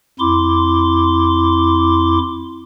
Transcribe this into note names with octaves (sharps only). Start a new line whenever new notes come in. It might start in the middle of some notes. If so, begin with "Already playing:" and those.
F2 E4 C6 D6